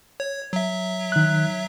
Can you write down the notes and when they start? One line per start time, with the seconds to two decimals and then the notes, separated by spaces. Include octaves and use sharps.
0.20 C#5
0.53 F#3 E5
1.12 D#3 F#6